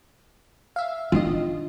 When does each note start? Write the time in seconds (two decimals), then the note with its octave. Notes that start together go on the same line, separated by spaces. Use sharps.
0.76 E5 F5
1.12 D#3 D4 F4 D#5